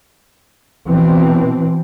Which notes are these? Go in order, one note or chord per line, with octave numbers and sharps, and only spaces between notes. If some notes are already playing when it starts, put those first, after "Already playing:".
B2 E3 C4